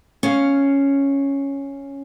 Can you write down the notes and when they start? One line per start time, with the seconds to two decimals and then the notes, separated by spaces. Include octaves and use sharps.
0.23 C#4 F5